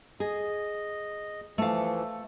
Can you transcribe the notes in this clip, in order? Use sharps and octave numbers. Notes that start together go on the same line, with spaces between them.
G#4 D#5
E3 F3 A3 F5